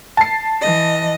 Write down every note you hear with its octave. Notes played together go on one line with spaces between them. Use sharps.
A5 C7
E3 D#5